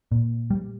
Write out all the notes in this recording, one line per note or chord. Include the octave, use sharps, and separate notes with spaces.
A#2
G3